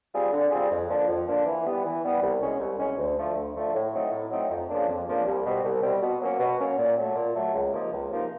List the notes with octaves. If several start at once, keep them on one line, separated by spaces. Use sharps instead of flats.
G3 C4 F4 G#4
D3
G3 C4 F4 G#4
F2
D3 F3 A#3 D4
F2
D3 F3 A#3 D4
E3
G3 B3
E3
G3 B3
C2
B2 G#3 C#4
C2
B2 G#3 C#4
D2
D3 F3 A3
D2
D3 F3 A3
A2
F#3 A3 C4 D#4
A2
F#3 A3 C4 D#4
F2
C#3 F3 A#3 D4
F2
C#3 F3 A#3 D4
C2
B2 G3 C4
C2
B2 G3 C4
B2
F#3 A#3 C#4
B2
F#3 A#3 C#4
A#2
F#3 A3
A#2
F#3 A3
C#2
C3 F3 A#3 D#4
C#2
C3 F3 A#3 D#4